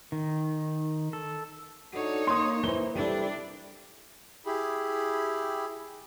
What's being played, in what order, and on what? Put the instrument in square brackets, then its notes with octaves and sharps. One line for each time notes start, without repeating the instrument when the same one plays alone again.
[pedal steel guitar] D#3
A4
[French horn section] D4 F#4 A4 [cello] D#4 C#5
[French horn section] A#3 [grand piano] C6 D#6
[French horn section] E3 [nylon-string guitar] A#3 C5 [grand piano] G7
[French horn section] C3 G4 A4 [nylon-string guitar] G3 E4 [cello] D4
[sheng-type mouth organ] E4 G4 G#4 B5